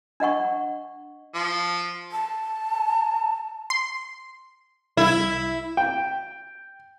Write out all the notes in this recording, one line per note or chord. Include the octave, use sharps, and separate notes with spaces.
D4 D#5 F#5 C#6
F3
A5
C6
C2 E4
G5